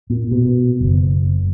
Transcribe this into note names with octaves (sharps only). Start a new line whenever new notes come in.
A#2
B2
F#1